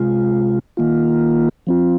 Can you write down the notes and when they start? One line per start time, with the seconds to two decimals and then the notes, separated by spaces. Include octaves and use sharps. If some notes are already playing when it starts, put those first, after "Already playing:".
Already playing: C3 G#3 F4
0.77 D#3 A#3 F4
1.67 F3 C4 F4